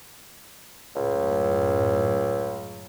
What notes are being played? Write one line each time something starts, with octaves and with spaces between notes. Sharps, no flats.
C#2 F#2 A2